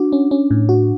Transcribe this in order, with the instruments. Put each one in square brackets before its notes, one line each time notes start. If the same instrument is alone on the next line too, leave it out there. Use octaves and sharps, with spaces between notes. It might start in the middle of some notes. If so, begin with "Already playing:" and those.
Already playing: [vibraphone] D4 [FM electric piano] F#4
[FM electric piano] C#4
C#4
A2
F#4